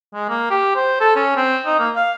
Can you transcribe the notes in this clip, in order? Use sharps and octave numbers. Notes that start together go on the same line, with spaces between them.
G#3
A#3
G4
C5
A4
C#4
C4
D#4
A#3
F5